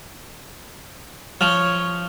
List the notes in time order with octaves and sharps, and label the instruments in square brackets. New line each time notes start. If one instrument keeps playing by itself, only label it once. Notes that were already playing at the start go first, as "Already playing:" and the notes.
[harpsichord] F3 [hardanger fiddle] C#5 [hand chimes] F6